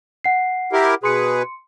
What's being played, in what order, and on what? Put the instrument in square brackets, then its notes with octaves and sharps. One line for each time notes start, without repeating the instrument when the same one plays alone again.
[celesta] F#5 C7
[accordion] E4 G4 A#4
[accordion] B2 G#4 B4 [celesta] C6 C#7